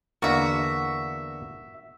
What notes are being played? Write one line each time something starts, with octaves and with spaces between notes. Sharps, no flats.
E2 D3 A#3 F#4 E5